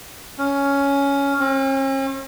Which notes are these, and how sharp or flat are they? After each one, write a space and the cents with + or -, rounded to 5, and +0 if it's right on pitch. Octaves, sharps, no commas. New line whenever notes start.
C#4 +10
C#4 -45